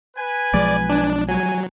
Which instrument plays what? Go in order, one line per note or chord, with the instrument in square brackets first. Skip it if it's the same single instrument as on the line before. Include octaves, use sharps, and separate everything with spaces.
[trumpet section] B4 G#5
[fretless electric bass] B1 F3 G#3 [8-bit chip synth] D5
[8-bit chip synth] D4
[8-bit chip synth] F#3 [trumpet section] G#5